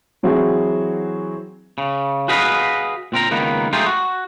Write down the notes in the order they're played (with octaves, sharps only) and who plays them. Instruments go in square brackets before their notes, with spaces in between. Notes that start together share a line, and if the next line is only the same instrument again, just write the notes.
[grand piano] E3 F#3 C4 E4 F#4 G#4
[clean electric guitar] C#3
F#4 G#4 B4 D#5 F5
A#2 C4 A#4 A#5
C#2 D#3 A#3 B3
G#3 A3 D#4 F4 G4 G#4
F#4